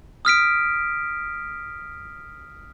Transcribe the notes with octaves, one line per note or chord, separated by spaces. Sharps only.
D#6 F6 B6 D7